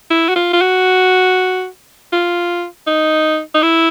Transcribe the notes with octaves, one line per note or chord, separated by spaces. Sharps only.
E4
F#4
F4
F4
F#4
F4
D#4
D#4
E4